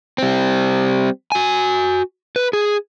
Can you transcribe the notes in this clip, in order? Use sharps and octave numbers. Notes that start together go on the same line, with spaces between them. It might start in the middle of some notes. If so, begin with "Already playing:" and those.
G3 C4
F#4 G#5
B4
G#4